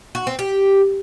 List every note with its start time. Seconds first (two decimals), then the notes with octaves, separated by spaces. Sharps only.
0.15 F#4
0.27 C4
0.39 G4